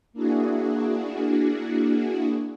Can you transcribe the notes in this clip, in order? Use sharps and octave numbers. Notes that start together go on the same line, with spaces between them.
A#3 D4 E4 F#4 G#4